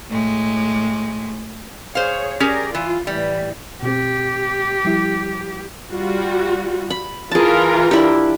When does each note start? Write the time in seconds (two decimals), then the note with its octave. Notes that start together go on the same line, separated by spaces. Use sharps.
0.10 A2 G#3
1.95 G#4 C5 C#5 F5
2.40 C#4 G4 G#4 A#4 D5
2.75 E3 F4
3.07 A2 E3 G3
3.83 B2 C4 G4
4.85 F3 G3 E4
5.90 G3 F4 F#4
6.90 B5
7.31 E3 F4 G#4 A#4 A5
7.91 D4 E4 G4